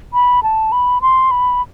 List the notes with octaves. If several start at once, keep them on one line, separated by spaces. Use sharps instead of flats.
B5
A5
B5
C6
B5